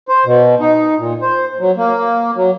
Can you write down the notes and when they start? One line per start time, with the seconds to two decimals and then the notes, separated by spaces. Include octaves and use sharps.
0.08 C5
0.26 B2
0.60 D#4
0.98 A#2
1.21 C5
1.60 F#3
1.77 A#3
2.36 F#3